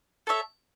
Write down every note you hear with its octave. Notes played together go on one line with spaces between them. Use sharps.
A4 C#5 E5